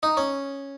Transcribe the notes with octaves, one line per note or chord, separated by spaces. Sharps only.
D#4
C#4